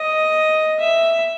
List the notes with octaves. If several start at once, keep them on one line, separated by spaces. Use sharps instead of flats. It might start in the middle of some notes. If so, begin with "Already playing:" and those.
Already playing: D#5
E5